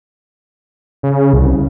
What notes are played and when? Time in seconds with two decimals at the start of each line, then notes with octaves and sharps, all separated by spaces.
1.03 C#3
1.33 C2